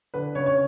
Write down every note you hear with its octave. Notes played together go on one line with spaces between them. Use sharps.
D3 B4
C#3 C#5
C#5